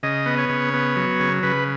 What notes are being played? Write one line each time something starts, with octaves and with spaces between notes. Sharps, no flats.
C#3 D#5
B3
C#5
C#3
B3
F#3
C#3
C#3 B4